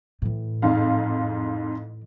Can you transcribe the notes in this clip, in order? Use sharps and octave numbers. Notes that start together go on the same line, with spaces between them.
A2 E3
F2 G#2 F5